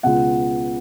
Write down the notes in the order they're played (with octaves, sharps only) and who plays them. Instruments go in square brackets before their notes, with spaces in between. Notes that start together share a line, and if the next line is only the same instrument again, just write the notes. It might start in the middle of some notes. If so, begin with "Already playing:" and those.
[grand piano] C#2 B2 F#5